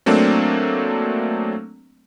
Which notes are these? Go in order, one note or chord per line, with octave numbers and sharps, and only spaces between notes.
F#3 A3 A#3 C4 D4